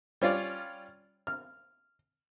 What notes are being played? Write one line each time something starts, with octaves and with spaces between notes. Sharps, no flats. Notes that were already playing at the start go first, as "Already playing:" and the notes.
G3 C#4 F4 D5
F6